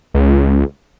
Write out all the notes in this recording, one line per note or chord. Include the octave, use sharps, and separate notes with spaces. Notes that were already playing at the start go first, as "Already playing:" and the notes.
C#2